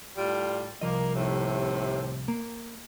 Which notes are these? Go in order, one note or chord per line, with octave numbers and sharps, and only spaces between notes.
A2 G3 F4
C2 F3 A#3 D#5
D#2 A2 C3
A#3